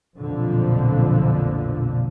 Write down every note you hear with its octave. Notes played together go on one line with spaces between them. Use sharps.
B1 F2 A#2 D3 F3